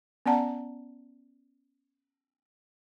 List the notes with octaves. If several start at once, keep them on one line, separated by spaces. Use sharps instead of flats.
B3 C#4 D5 F#5 A5 A#5